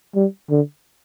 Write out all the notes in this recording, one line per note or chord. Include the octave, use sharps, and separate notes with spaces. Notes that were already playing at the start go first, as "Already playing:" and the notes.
G3
D3